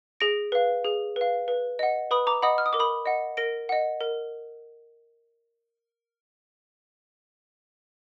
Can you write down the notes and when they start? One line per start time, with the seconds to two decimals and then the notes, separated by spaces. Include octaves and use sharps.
0.20 G#4 A#6 D7
0.52 B4 F5
0.85 G#4
1.16 B4 F5
1.48 B4
1.79 D#5 F#5
2.11 B4 B5 D#6
2.27 A#5 D6
2.42 D#5 F#5 B5 D#6
2.58 F6
2.66 D#6
2.73 A#4 D6
2.79 B5 D#6
3.06 D#5 F#5
3.37 A#4 A#6 D7
3.69 D#5 F#5
4.01 A#4